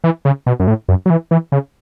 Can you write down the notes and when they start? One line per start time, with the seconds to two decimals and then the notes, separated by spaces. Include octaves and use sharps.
0.04 E3
0.25 C#3
0.47 B2
0.60 F#2
0.67 A2
0.88 F#2
1.06 F#3
1.10 E3
1.31 E3
1.52 C#3